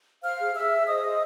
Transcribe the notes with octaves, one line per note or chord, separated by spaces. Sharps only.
C5 F5 F6
G#4
G#4 E5 E6
G#4
C5 D#5 D#6
C5